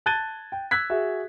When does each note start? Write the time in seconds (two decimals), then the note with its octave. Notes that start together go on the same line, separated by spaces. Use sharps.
0.06 A5 F#6 G#6 A6 D#7 G7
0.52 G5
0.71 E6 F#6 G#6 B6
0.90 F#4 G#4 E5